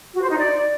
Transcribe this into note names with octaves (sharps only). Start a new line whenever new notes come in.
F#4
C5
D#4
D5